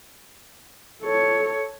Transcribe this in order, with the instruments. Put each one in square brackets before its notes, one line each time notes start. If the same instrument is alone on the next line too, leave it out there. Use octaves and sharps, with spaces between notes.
[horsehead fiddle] A4 C#5